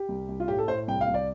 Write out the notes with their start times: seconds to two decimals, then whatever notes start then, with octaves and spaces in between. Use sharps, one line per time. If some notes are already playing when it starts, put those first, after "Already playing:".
Already playing: G4
0.09 C2
0.29 C2
0.40 F4
0.48 A2 G4
0.59 A4
0.68 A2 C5
0.88 C2 G5
1.01 F5
1.07 C2
1.14 D5